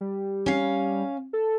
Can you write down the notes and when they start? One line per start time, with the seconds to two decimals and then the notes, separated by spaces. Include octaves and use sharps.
0.01 G3
0.46 C#4 F5
1.33 A4